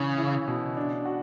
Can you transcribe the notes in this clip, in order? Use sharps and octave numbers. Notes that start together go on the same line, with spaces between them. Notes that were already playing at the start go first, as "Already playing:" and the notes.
Already playing: C#3 E3 C#4
E4
B2
D4
F#4